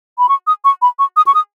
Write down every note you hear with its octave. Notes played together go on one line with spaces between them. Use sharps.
B5
C#6
D#6
C#6
B5
C#6
D#6
C#6
D#6